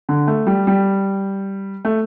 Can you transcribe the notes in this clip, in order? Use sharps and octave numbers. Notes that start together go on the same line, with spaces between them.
D3
A3
G3
G3
A3